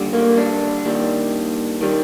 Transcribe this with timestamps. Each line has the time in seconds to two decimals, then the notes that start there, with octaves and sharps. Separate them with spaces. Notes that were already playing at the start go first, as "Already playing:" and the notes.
Already playing: D#2 D3 G3
0.13 A#3
0.38 D4
0.85 D#2 D#3 G3
1.81 D#3 G3